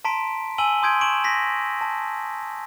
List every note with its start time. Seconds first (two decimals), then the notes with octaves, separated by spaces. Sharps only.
0.05 A5 A#5 C6 B6 D7
0.58 G#5 A5 E6 D#7 F#7 G7
0.82 C6 D#6 G6 G#6 D7
1.01 C#6 D7 E7 F#7
1.24 A#6 B6
1.81 A5